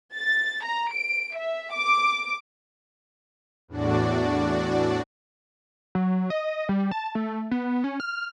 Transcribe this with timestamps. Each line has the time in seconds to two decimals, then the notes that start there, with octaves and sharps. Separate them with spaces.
0.15 A6
0.65 A#5
0.93 D7
1.37 E5
1.74 D6
3.68 E2 A2 D4 F#4 D5
5.95 F#3
6.30 D#5
6.69 G3
6.91 A5
7.15 A3
7.51 B3
7.84 C#4
8.00 F6